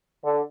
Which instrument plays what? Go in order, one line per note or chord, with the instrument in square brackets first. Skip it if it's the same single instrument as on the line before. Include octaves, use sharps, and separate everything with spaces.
[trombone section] D3